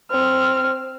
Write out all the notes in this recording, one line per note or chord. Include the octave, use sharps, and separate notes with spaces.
C4 F6